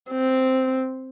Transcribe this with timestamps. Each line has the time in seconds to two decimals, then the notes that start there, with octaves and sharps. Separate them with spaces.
0.11 C4